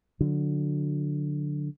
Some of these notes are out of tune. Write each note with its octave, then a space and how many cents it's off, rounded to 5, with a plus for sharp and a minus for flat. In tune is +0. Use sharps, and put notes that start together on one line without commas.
D3 +0 F#3 -30